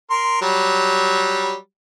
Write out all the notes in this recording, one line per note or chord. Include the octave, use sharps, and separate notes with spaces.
A#4 C6
F#3 G3